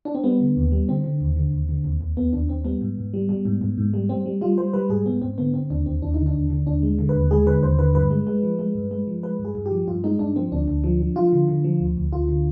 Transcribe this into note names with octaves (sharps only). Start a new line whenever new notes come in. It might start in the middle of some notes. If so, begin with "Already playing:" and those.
D4
C4
G3 B3
D3
D#2
G3
D3 C4
D3
D#2
D3
D#2
D3
D#2
D#2
D#2 B3
D#2 D4
D#2 C4
G3 B3
G#2
G#2
G3
G3
G#2
G#2
G#2
G3
G3 C4
G3
G3 F4
G3 C5
G3 B4
G#2 G#4
G#2 B3
G#2 C4
D3 B3
D3 C4
D#2 D4
D#2 C4
D#2 D4
D3 D#4
D4
D#2
D3
D#2 D4
G#3
D3
B4
D#2
G#3 G#4
D3 B4
D#2 C5
D3 B4
G2 B4
G#3
G#3
F3
G#3
G2
G#3
F3
G#3 B4
G2
G#4
G2
G4
F3
G2 F4
G#3 D#4
G2 D4
F3 C4
D2 D4
D2
F3
F3
F3 F4
D3
D3
F3
D2
D2
D2 F4
D3